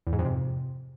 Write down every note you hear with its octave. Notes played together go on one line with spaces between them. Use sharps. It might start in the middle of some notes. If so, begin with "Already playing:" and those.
E2
G#2
F2
C3